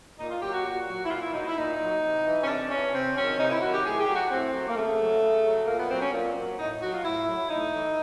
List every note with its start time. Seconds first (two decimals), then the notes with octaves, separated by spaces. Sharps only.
0.19 A#2 D#4
0.30 F4
0.42 F#3 G4
0.53 F#4
0.65 A#2 F#4
0.88 F#3
1.05 E4
1.10 A#2 F4
1.22 E4
1.33 F#3 D#4
1.46 E4
1.56 A#2 D#4
1.79 F#3
2.02 C3
2.24 E3
2.43 C#4
2.47 C3 D4
2.71 E3 C#4
2.93 C3 C4
3.16 D#3 F#3 C#4
3.38 C3 D#4
3.51 E4
3.62 D#3 F#3 F#4
3.73 G4
3.85 A2 G#4
4.00 G4
4.07 F#3
4.15 F#4
4.30 A2 C4
4.53 F#3
4.68 A#3
4.76 C#3 A3
4.99 F#3
5.21 C#3
5.44 F#3
5.67 A#2 A#3
5.79 B3
5.90 F#3 C4
6.02 C#4
6.13 A#2
6.36 F#3
6.59 A2 D#4
6.81 F#3 F#4
6.93 F4
7.04 A2 E4
7.27 F#3
7.50 A2 D#4
7.73 E3